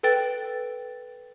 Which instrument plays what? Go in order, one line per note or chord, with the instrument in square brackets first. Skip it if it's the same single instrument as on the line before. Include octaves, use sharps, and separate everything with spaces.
[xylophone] A4 B4 G5 A6